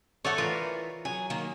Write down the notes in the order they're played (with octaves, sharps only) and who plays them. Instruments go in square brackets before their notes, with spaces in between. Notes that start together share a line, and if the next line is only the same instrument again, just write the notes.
[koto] A3 A4 C#5 [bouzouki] D5 F#5
[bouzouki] E3 [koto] F4 A#4
[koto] F#3 [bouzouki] G#4
[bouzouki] D#3 A#3